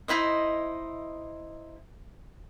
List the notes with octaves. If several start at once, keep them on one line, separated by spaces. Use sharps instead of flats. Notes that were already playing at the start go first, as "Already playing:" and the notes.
D#4 E4 C5 D#5